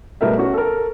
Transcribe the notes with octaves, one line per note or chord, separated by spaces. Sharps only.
B1 G3 A3 A#4 B4 E5
C#4 F#4
A4 A#4